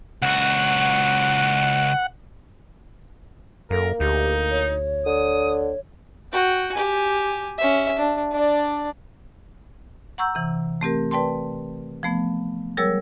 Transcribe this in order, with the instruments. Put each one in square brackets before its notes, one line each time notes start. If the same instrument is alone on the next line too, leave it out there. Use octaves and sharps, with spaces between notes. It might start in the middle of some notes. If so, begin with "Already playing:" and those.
[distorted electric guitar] C#2 F#4 [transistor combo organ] F#5
[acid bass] F#2 [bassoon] A#3 [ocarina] A4 [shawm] A#4
[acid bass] D2 [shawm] D#4 [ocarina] G4
[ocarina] C#5
[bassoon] D3 [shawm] D#6
[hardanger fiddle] F#4 G5
G4 G#5
C#4 E5
D4
D4 D5
[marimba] F#5 A#5 C#6 E6 G6
C3 E3
A3 C4 G4 A#4
B4 D5 G5 A5 C6
F3 A3 B3
F#3 G3 G#4 A#4 C#5 E6